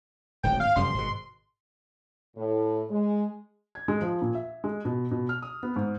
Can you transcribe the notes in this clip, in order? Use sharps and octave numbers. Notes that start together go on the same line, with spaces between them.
D1 G#1 G#2 G5
F5
F1 F#2 G3 C6
G#1 B2
A2
G#3
G#6
G#3
F3
A#2
E5
G#3
B2
B2
F6
D#6
B3
G#2